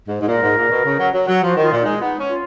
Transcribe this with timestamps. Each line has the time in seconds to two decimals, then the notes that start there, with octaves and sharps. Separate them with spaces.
0.08 G#2
0.21 G#2
0.28 A#2 A#4
0.42 G#2
0.56 A#2
0.71 B2
0.85 C#3
0.99 F#3
1.14 F#3
1.28 F#3
1.42 F3 F#4
1.57 D#3 F4
1.71 A#2
1.81 G#3 D#4
2.00 B3 D#4 F4
2.20 C#4
2.29 F4